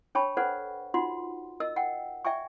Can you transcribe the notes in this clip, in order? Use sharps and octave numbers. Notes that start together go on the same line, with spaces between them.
D4 C#5 G5 A5 B5 C#6
A4 B4 C5 D5 F#5
D#4 F4 F#4 F#5 C6
A#4 D#5 E6
F#5 G5
D5 E5 G5 G#5 C#6